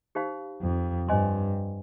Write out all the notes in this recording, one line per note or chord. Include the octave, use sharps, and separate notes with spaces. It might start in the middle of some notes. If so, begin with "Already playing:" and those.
D#4 G4 C5 F5 B5
F2
G2 C5 D#5 G#5 C6